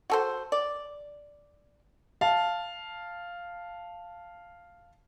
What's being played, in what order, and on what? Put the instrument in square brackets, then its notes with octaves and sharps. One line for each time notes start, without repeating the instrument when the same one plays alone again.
[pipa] F#4 A4 C5
D5
[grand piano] F5 A5